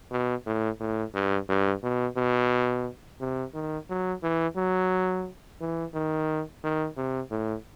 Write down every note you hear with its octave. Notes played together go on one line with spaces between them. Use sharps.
B2
A2
A2
G2
G2
B2
B2
C3
D#3
F#3
E3
F#3
E3
D#3
D#3
C3
A2